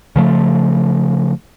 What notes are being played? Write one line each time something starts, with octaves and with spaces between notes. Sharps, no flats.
C#3 F3 A3